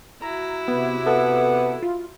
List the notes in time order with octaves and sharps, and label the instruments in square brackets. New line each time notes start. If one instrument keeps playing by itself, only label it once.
[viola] E4 F#4 [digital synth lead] A#5
[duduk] C3 [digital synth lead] B3
[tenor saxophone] B3 [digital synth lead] A4
[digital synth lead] F4